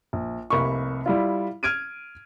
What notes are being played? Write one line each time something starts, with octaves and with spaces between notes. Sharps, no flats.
A#1
F1 C2 A#3 B5 C#6
G3 E4 F4
F6 G#6 D7 D#7